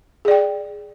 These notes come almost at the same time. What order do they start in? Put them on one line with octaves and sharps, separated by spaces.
G#4 D5 G5